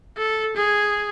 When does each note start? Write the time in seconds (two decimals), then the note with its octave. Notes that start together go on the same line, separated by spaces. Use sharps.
0.17 A4
0.56 G#4